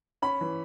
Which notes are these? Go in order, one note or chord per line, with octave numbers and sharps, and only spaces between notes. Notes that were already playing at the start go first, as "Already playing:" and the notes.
C#4 B5
E3